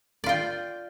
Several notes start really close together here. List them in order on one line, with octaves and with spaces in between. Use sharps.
D5 F4 G5